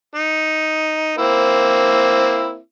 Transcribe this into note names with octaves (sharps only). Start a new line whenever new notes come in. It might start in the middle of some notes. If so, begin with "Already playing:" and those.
D#4
A#3 C4 E4